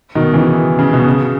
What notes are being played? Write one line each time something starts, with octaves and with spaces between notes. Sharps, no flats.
B2 D#3
C#3 E3
C#3
B2
C#3